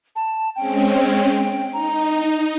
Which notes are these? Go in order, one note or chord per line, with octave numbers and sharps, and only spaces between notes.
A5
G#3 C4 C#4 G5
D#4 A#5